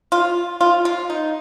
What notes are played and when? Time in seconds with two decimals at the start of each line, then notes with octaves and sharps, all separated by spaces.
0.12 F4
0.61 F4
0.85 F4
1.10 D#4